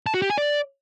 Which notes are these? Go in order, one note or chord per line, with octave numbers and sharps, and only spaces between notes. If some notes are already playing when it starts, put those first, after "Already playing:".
A5
F#4
G4
G#5
D5